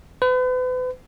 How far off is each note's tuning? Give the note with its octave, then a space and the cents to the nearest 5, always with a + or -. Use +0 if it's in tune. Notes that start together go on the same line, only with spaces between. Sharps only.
B4 +40